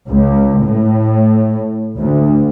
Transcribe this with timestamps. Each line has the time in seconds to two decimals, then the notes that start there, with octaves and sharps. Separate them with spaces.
0.10 C#2
0.64 A2
1.98 D2